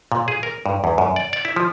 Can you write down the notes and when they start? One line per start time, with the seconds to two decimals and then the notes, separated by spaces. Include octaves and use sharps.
0.12 A#2
0.28 G#4
0.43 A#4
0.66 G2
0.84 E2
0.98 F#2
1.16 D5
1.33 D5
1.45 E4
1.56 F3